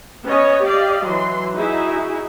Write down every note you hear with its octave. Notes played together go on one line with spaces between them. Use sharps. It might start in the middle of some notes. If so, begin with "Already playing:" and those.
B3 C#4 C#5 D#5
G4 D5 D#5 F5
E3 F#3 C6
D#4 E4 F#4 G#4 E5